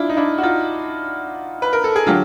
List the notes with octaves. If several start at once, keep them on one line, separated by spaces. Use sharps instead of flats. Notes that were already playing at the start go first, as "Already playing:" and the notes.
Already playing: D4 E4 F4
D#4
D4 E4
F#4
D#4 F4
B4
A#4
A4
G#4
D3 F#3 F4 G4